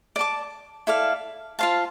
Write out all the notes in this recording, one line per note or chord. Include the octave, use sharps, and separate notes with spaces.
D5 A5 D6
E4 A4 D5 F5
F4 C5 F5 A5